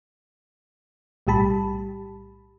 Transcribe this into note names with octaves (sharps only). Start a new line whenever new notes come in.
B1 A2 G3 G4 A5 B5